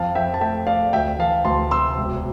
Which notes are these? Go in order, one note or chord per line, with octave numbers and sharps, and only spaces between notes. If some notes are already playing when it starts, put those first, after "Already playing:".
Already playing: F2 F5 A5
F2 E5 G5
A5
A3 E5 G5
A3 D5 F5
D2 E5 G5
E3 F5 A5
D2 A5 C6
C3 C6 E6
E1